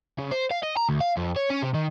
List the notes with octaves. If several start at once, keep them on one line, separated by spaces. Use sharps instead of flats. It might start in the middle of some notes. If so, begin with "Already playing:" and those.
C#3
C5
F5
D#5
A#5
D2
F5
F2
C#5
C#4
C3
D#3